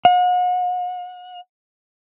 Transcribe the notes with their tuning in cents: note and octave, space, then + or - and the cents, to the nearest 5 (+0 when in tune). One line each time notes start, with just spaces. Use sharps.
F#5 -40